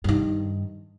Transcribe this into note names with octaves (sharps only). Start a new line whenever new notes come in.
G2 D#3